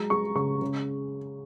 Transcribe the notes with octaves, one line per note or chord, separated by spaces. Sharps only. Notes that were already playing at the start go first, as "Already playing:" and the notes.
Already playing: F#3 G#3 A#5
G#3 C#6
C#3 C#6
C#3